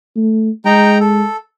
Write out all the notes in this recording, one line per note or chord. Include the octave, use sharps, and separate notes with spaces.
A3
G#3 D#4 G5 A#5
A4